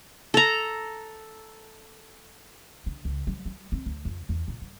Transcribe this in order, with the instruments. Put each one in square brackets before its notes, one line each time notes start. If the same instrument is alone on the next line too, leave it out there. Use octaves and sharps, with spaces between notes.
[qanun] A4 A#5
[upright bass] D3
C#2
G3
G3
C4
D2
F2
E2
A#2
G2